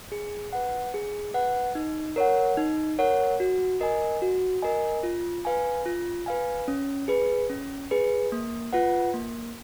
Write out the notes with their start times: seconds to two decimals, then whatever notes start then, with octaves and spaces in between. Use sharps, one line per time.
0.12 G#4
0.53 B4 F#5
0.94 G#4
1.34 B4 F#5
1.75 D#4
2.16 A#4 C#5 F#5
2.57 D#4
2.99 A#4 C#5 F#5
3.40 F#4
3.81 A#4 D#5 G#5
4.22 F#4
4.62 A#4 D#5 G#5
5.03 F4
5.45 B4 F5 G#5
5.86 F4
6.26 B4 F5 G#5
6.68 C#4
7.08 G#4 B4
7.50 C#4
7.91 G#4 B4
8.32 A#3
8.73 F4 B4 F#5
9.13 A#3